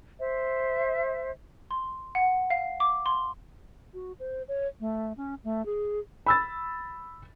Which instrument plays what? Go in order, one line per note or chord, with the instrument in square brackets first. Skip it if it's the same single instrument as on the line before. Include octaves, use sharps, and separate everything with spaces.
[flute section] C5 E5
[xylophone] C6
F#5
F5
D6
C6
[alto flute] F#4
C5
C#5
A3
C#4
A3
G#4
[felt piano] B5 E6 A6